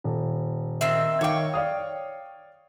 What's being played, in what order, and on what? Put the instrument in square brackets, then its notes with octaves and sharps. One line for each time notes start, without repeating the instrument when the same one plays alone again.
[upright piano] D#1
[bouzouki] D#3 C4 E5
[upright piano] D#3 F5 D6 [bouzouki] C#5 G5
[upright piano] D5 F5 D#6